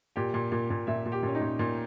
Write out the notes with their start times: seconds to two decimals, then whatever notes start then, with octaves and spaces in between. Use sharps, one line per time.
0.16 A#2 G4
0.34 A#2
0.52 A#2
0.70 A#2
0.87 A#2 E5
1.05 A#2
1.12 G4
1.23 A#2 C#4
1.35 D#4
1.41 A#2
1.59 A#2